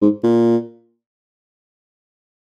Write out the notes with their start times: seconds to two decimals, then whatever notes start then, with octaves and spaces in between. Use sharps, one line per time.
0.01 G#2
0.24 A#2